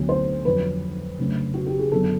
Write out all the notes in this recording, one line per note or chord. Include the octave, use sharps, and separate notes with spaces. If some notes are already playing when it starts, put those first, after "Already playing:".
Already playing: D2 D3 F#3 B3 D4
C5
F2 D3 F#3 B4
C#3 F#3 A3 D4
F#4
G4
G#4
F#2 D3 F#3 B3 D4 A4